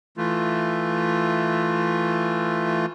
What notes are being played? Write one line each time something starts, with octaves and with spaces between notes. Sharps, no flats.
E3 A3 F4